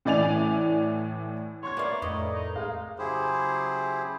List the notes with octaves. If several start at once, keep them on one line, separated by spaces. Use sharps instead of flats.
A2 E3 D5 G#5 F7
C#5 C6 C#6 G#6
A#3 B4 D5 E5 F5
F2 A2 D#5
D#4
G#3 G#4 E5 F5
C#3 F#3 E4 G4 G#4 C5